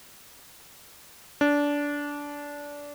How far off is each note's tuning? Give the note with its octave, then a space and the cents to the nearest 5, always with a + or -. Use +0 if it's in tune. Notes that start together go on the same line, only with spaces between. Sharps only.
D4 -20